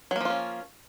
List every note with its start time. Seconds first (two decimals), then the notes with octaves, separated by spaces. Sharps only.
0.11 F#3
0.16 A#3
0.21 F3
0.25 F4
0.30 C#4